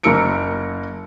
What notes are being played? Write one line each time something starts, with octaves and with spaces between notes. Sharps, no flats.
F#1 A#3 A#4 E6 C#7 D7